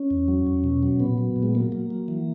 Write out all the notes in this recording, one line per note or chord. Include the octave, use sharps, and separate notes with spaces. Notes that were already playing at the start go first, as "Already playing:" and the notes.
Already playing: C#4
E2
F#3
E2
B2
F#3
A#2 B3
F#3
A#2
G#3
F#3 A#3
F#3
F#3
E3